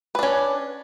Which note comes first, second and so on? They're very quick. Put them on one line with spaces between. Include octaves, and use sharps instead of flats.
B4 D4 C#4